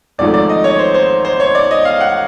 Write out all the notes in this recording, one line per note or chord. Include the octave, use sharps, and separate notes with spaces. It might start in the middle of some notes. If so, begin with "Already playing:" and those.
G#1 G#2 F3 A3 D5
D5
D#5
C#5
C5
C5
C5
C#5
D5
D#5
F5
F#5